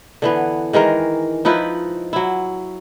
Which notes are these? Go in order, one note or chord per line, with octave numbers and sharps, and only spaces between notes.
D3 E3 B3
D#3 E3 G#3 A#4
F3 D#4 E4 B4
F#3 E4